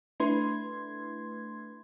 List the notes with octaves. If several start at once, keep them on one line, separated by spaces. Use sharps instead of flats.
A3 D4 E4 B4 C6 G#6